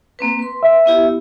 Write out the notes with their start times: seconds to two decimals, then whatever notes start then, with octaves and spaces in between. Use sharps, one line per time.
0.19 A#3 C4 B4
0.39 B4 C6
0.63 E5
0.86 B3 E4 G4